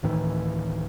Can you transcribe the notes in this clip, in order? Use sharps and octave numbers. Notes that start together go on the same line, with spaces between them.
D1 A2 D#3 E3